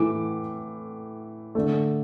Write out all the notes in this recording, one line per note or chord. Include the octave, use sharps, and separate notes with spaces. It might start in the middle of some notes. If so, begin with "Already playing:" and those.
Already playing: A2 E3 A3 D6
D3 A3